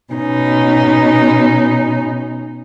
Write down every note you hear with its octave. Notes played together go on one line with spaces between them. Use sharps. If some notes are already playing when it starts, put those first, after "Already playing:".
B2 C#4 D#4